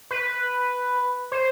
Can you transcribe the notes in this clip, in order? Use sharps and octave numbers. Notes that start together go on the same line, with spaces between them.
B4
C5